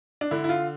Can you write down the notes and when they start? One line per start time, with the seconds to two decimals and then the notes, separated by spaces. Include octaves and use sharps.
0.21 D4
0.31 D3 E4
0.44 E4
0.49 F4